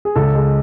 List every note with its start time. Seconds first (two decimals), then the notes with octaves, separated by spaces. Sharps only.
0.05 G#4
0.15 C#2 A4
0.35 G#3